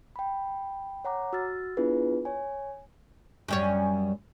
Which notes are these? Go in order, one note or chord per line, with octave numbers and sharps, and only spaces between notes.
G5 B5
C#5 F#5 A#5 D6
F#4 E6 F6 A6
B3 D4 E4 F4 G#4 B4
C#5 G#5
F#2 G3 C#4